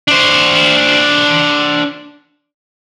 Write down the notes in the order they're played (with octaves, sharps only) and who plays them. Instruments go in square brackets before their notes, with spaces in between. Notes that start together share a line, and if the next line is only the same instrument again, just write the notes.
[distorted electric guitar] D4 C5